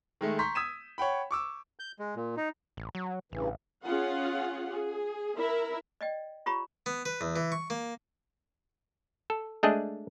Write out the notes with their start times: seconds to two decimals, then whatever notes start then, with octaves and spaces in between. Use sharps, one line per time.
0.21 D#3 G#3 A3
0.39 A#5 C6 C#6 G6 B6
0.55 D#6 E6 G#6 B6 D#7 E7
0.98 C#5 F#5 G5 B5
1.31 C#6 D6 E6
1.79 G6
1.99 G#3
2.16 A#2
2.37 D#4
2.77 A1
2.95 F#3
3.32 A1 G2 C#3 E3
3.84 C#4 F4 G#4 F#5
4.68 G#4
5.38 E4 A#4 E5
6.01 D5 D#5 G5
6.46 F4 G4 C#5 A#5 B5 C#6
6.86 B3
7.05 B4
7.21 E2
7.36 E3
7.52 C#6
7.70 A#3
9.30 A4
9.63 G#3 A3 D4 G#4 D#5